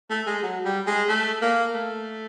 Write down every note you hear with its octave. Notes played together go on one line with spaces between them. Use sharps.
A3
G#3
F#3
G3
G#3
A3
A#3
A3